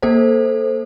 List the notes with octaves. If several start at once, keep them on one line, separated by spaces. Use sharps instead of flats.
A#3 A4 C5